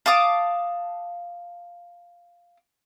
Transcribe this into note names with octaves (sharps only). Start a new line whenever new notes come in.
F5 A5 D6 D#6